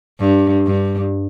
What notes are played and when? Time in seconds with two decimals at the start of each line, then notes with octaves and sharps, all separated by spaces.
0.19 G2
0.66 G2